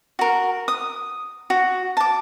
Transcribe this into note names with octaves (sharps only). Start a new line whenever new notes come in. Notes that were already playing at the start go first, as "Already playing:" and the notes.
F#4 A#4
D#6
F#4
A5 D6